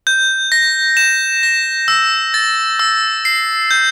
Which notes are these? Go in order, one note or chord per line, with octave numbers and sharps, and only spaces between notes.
G6
A#6
E7
A#6
E6
A6
E6
C7
G6